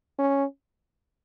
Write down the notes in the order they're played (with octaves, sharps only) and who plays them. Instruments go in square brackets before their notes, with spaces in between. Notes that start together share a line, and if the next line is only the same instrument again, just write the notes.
[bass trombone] C#4